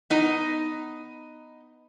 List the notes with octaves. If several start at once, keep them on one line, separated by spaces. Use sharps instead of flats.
B3 D#4 D#5